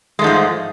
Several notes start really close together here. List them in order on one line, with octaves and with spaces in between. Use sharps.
G#3 A3 G#2 F3